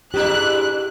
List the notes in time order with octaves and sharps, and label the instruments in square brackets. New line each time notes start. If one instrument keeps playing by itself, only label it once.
[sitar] G#2 D4 E4 [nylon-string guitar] G4 [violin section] F#6